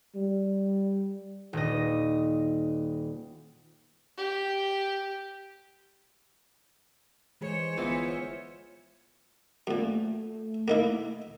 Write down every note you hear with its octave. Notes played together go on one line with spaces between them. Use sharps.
G3
D#1 D#5
G4
E3 G#3 G#4 C5 C#5
G1 E3 B3 F4 E5
F#2 A#2 A3
A#3 D#4 E4